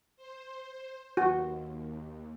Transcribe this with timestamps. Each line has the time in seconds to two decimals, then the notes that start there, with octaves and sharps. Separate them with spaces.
0.17 C5
1.17 D#2 F#4